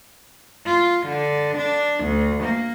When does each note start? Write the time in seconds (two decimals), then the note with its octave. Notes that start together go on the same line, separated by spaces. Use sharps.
0.65 F4
1.06 D3
1.57 D4
2.03 D2
2.43 A#3